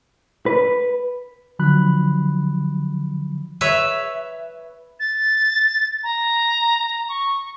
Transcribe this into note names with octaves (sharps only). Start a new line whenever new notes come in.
B4
D3 F3 F#3 B5 F#6
B4 C#5 E5
A6
A#5
C#6